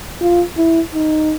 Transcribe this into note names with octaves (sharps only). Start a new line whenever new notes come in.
F4
E4
D#4